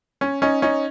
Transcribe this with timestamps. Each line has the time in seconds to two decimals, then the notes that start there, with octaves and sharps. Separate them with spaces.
0.21 C#4
0.42 C#4 D#4
0.62 C#4 D#4